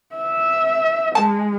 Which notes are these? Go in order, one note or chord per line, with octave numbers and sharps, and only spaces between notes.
E5
G#3 A5